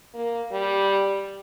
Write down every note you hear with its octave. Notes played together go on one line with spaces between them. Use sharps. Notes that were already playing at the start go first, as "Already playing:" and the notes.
A#3
G3